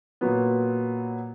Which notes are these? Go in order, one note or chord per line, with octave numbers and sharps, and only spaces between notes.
A#2 F#3 B3